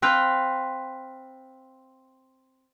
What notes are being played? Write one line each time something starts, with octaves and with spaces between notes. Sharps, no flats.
C4 B4 F5 G5